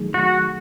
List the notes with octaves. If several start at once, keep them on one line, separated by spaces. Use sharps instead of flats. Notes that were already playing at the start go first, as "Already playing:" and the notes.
Already playing: D#3 F#3 A3 D#4 G#4
F#4